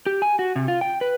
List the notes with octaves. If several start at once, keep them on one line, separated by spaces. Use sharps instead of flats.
G4
G#5
F#4
C3
F4
G5
B4